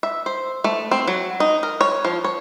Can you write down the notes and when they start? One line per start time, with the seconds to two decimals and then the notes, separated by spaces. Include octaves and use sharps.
0.03 E5
0.26 C5
0.64 A3
0.91 C4
1.08 F#3
1.40 D#4
1.63 A#4
1.81 C#5
2.05 F3
2.24 C#5